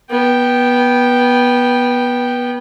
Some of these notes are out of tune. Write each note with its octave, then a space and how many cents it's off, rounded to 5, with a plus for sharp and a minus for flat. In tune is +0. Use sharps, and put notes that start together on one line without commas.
B3 -20 G5 +0